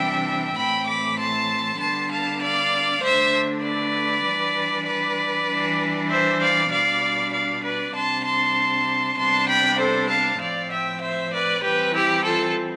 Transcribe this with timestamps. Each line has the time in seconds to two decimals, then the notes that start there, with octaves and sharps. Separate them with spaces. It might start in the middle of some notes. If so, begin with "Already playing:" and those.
Already playing: C3 E3 G3 D4 E5 G5
0.57 A2 E3 A3 C4 G5 B5
0.87 B5 D6
1.18 A5 C6
1.80 D3 G3 B3 D4 A5 C6
2.11 F5 A5
2.42 D5 F5
3.03 D3 A3 D4 C5 E5
3.64 B4 D5
4.26 E3 G3 D4
4.87 B4 D5
5.48 E3 G3 D4
6.10 C5 E5
6.41 D5 F5
6.72 B2 G3 D4 D5 F5
7.33 D5 F5
7.64 B4 D5
7.95 C3 G3 D4 A5 C6
8.25 A5 C6
9.18 C3 G3 B3 D4 A5 C6
9.49 G5 B5
9.79 A4 C5
10.10 F5 A5
10.41 A2 F3 A3 C4 D5 F5
10.72 E5 G5
11.02 C5 E5
11.33 B4 D5
11.63 E3 G3 C4 G4 B4
11.94 E4 G4
12.25 F4 A4